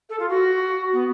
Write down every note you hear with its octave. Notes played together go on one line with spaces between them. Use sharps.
A4
F4
F#4
B3